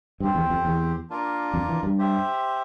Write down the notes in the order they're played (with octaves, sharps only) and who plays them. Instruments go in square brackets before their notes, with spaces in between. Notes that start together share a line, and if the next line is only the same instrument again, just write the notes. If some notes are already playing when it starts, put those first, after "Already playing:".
[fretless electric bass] G2 [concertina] C4 G4 C5
[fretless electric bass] E2
F2
E2
[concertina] A#3 D4 F4 A#4
[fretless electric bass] F2
E3
G2
[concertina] G4 C5 E5